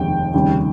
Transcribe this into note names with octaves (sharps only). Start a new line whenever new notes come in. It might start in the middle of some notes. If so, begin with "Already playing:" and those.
Already playing: F1 D#2 C#3 G#3 G5
F1 D#2 C#3 G3